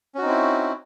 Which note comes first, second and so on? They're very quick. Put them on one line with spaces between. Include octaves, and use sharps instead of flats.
C#4 F#4 D#4 C4 E4